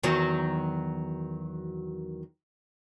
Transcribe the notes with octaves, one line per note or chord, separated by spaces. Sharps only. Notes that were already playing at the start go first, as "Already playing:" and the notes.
E2 D#3 F#3